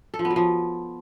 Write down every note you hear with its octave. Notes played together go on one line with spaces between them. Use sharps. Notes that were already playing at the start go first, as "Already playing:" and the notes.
A4
F3
B3
F#3
F3